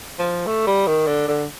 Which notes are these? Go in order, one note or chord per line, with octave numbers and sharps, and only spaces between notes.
F3
A3
G3
D#3
D3
D3